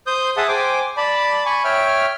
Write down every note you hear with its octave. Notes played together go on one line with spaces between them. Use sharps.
C5 D#6 G6
G#4 E5 F#5 A5 D#6
C5 G5 G#5 D6
D5 A5 B5
G#5 B5 C#6
C#5 E5 G5 F6